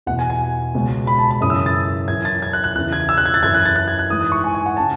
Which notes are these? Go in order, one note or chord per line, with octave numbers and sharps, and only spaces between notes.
E2 B2 F#5
G#5
G#5
C#2 B2
B5
A5
B5
F#2 C#3 E3 D#6
E6
D#6
A6
F#2 E3 G#6
A6
G#6
F#6
F#6
E2 C#3 E3 F#6
G#6
E6
F#6
G#6
A6
F#2 E3 G#6
F#6
A6
F#6
G#6
F#6
G#2 E3 D#6
D#6
C#6
G#5
G#5
F#5
C#3 A5